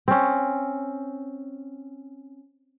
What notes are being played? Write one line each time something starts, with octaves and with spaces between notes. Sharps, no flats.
C4 C#4